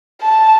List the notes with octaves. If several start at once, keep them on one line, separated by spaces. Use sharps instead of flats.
A5